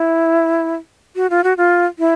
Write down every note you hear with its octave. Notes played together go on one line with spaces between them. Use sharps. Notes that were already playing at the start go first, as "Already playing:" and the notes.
Already playing: E4
F#4
F4
F#4
F4
E4